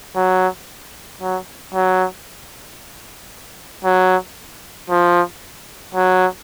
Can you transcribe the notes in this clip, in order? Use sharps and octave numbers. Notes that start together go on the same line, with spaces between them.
F#3
F#3
F#3
F#3
F3
F#3